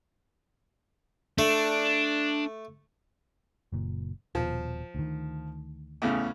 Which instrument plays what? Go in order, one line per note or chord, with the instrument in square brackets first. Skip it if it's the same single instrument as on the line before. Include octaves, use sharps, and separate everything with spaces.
[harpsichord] A3 [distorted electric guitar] D4
[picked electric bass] F#1 A#2
[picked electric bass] D#1 B2 [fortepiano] F3
[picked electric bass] D2 D#3
[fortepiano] E2 A2 C#3